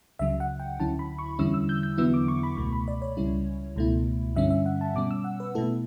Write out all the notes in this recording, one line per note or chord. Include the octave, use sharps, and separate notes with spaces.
C#2 C#3 F#3 E5
F#5
G5
D2 D3 F#3 C#4 E4 A5
B5
C#6
E2 D3 G3 C#4 E4 E6
E6
G6
G6
E2 D3 F#3 B3 E4 E6
D6
C#6
B5
C#2 B2 A3 C#6
B5
D5
C#5
C#2 C#3 G3 C#4 E4
C#2 B2 A3 E4
G2 D3 G3 C#4 E5
E5
F#5
A5
B2 G3 C#4 D6
E6
F#5
B4
B2 A3 E4 A4